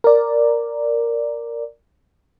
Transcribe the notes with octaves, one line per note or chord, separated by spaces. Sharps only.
A#4 D5